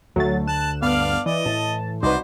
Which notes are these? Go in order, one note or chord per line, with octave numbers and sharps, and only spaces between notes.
D2 D3 F#3 A3 A6
A5 F#6 E7
G2 B3 D4 D5 F5 F6
E3 D5 D#5
A2 A5
C2 D#4 F#4 B4 C5 D5